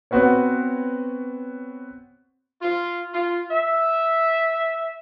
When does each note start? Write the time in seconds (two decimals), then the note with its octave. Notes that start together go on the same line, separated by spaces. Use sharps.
0.11 B3 C4 F#4 B4 C#5
2.61 F4
3.13 F4
3.50 E5